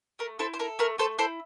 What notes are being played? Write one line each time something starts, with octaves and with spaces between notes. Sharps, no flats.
A3 A#4
E4 A4 C5
C5
A4 A#4
A3 A#4
A3 A4 C5
E4 A4 C5